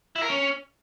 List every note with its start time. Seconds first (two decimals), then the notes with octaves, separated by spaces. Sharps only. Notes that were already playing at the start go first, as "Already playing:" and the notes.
0.16 E4
0.22 A#4
0.29 C#4